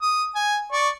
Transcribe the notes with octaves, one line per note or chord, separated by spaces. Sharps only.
D#6
G#5
D5 C#6